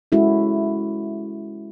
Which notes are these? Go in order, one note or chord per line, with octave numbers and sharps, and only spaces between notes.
G#3 C#4 E4 F#4 A4